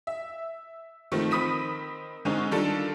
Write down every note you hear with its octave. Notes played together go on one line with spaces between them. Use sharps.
E5
D#3 F3 A3 C4
D#3 C4 B5 D#6 B6 D#7
D3 G#3 C4 C#4 D#4
D#3 G3 D4 F4 A4